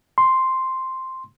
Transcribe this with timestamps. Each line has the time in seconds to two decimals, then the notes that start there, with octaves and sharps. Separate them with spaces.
0.18 C6